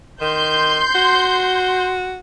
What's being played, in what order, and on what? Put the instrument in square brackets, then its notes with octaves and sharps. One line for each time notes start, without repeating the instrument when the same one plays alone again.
[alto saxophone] D#3 [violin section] C6 G6
[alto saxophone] F#4